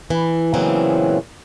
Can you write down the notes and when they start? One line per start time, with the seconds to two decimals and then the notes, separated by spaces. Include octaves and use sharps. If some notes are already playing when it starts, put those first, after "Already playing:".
0.10 E3
0.54 A#2 C#3 E3 F#3 B3 C4